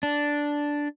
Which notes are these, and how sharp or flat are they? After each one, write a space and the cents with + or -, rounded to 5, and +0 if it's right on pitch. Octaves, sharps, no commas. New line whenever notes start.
D4 -5